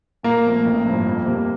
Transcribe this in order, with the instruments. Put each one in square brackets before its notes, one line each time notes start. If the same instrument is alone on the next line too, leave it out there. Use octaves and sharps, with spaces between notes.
[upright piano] A#2 [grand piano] A#3
[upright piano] F3 A3 C4
A1
G2 F3 C4 F4
F2
C3 G3 A#3